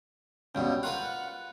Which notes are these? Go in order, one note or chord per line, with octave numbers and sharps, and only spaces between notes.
C#2 G2 B2 C#4 G5
F4 A#4 B4 F#5